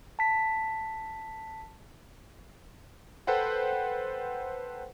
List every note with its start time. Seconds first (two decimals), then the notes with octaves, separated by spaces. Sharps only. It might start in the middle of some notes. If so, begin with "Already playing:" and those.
0.19 A5 B6
3.27 A4 B4 C5 F#5 G5